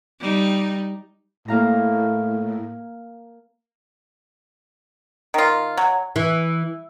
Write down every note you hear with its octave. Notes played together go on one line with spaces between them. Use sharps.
G3 D#4
A2 A#3 F5 A#5
D#3 F4
F#3
E3